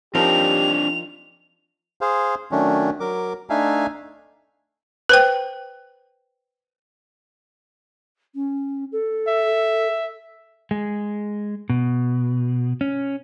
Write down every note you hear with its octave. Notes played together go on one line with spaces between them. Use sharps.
F3 C4 D4 D#4 G4 A#4 F7
G#4 C5 F5
D#3 F#3 A3 C#4 D4
F#3 A#4 D6
A3 D4 D#4 E5 F5 G#5
B4 C5 G5
C#4
A4
E5
G#3
B2
C#4